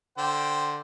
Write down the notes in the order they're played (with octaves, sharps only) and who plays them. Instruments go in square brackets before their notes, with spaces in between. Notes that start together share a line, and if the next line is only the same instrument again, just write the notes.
[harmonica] D3 C5 G5